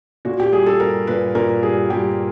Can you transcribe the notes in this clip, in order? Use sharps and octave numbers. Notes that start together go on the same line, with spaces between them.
A#2 F#4
G4
G3 G#4
A4
G3 A#4
A#2 B4
A#2 A#4
G3 G#4
G3 G4